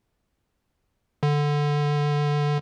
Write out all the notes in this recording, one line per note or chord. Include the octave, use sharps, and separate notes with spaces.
D3